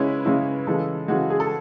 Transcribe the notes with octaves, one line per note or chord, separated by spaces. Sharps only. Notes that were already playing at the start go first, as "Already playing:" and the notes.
Already playing: C#3 G#3 C#4 E4 B4
C#3 G#3 C#4 E4
C#3 E3 G#3 A4
C#3 E3 G#3 F#4
G#4
A4